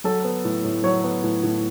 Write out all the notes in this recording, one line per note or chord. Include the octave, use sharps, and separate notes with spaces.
F#3 A4
B3
A2
A2
F#3 C#5
B3
A2
A2